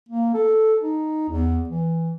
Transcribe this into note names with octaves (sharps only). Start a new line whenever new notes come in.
A#3
A4
D#4
E2
E3